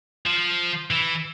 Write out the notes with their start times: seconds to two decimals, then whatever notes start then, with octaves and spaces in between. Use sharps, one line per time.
0.26 F3
0.91 E3